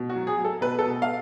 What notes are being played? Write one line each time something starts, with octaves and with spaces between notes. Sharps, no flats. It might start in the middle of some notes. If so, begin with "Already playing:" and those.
Already playing: B2
F#4
F#3
G#4
F#3
A4
B2 B4
A4
B2
F5